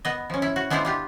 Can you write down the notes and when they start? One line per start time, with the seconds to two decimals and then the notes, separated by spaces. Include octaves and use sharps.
0.05 B3 D#5
0.30 F3 C#4
0.42 E4
0.56 F#4
0.70 G#3 B3 D4 E4 F4 C5
0.85 D4 F4 G4